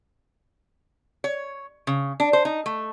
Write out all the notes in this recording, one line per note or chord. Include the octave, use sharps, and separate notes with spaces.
C#5
C#3
D4
C5
D#4
A3